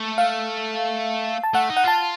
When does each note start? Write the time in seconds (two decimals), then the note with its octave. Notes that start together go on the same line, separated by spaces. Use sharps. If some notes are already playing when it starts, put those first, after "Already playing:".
Already playing: A3
0.18 F5
1.43 A5
1.54 A3 F#5
1.70 D#4
1.77 F#5
1.84 F4 A5